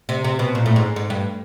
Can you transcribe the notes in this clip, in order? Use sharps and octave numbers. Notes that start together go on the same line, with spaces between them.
C3
C3
B2
A#2
A2
G#2
G#2
G2